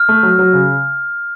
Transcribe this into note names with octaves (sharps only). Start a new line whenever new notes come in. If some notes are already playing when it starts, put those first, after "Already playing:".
Already playing: F6
A3
F#3
F#3
C#3